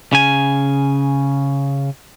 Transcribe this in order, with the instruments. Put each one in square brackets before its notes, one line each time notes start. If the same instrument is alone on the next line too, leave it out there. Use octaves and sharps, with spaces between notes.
[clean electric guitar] C#3 G#5